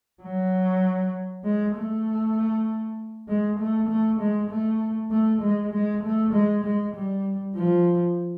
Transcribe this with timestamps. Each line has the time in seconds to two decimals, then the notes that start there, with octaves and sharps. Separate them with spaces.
0.23 F#3
1.44 G#3
1.76 A3
3.28 G#3
3.59 A3
3.89 A3
4.20 G#3
4.51 A3
5.11 A3
5.42 G#3
5.73 G#3
6.04 A3
6.33 G#3
6.65 G#3
6.94 G3
7.56 F3